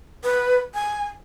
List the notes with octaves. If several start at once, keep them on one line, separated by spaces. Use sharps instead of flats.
B4
G#5